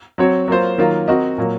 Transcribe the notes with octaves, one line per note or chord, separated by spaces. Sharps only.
F#3 C4 F#4 C#5
F#3 A#3 F4 C5
D#3 F#3 A#3 F4 A#4
C4 F#4 A#4 D#5
A#2 F#3 A#3